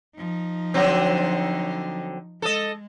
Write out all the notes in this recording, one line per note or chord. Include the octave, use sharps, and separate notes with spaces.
F3 D#4
D3 F#3 C4
G#3 A4 D#5